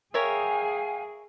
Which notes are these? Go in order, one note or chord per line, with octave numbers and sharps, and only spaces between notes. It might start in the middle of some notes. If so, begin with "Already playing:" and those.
G#4 A#4 C#5 E5 F5 G5 G#5